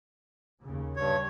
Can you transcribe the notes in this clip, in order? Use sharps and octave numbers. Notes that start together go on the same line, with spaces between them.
D#2 C#3
G2 C#5